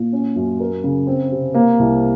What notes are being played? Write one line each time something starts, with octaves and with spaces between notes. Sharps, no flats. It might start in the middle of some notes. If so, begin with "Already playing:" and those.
Already playing: A#2 F4
C#4
F#2
A#4
C#3
C4
C3
A#3
C2